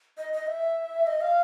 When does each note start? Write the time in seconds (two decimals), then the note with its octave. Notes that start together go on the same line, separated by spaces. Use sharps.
0.18 D#5
0.33 D#5
0.47 E5
1.07 D#5
1.21 F5